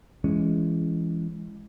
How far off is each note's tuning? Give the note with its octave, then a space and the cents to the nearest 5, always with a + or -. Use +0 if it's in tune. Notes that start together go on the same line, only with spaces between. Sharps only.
E3 +20 G#3 +0 C#4 +0